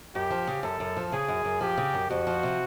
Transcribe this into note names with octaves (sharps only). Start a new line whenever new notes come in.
F#2 G4
F3
C#3
F#2 A4
F#2
F3
C#3 G#4
F#2
F#2
F3 G4
C#3
F#2
F2 F#4
F3
C3